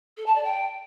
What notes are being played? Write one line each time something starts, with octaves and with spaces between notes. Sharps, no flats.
A4
A5
D5
G5